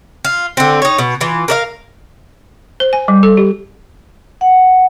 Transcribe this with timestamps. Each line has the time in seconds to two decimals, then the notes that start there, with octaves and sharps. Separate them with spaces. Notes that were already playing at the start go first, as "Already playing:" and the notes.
0.25 F4
0.57 D3 C4
0.82 D#4 C#5
0.99 B2
1.20 E3 F4
1.48 A#4 D5 F5
2.80 C5
2.93 G#5
3.08 G3
3.23 A4
3.37 G4
4.41 F#5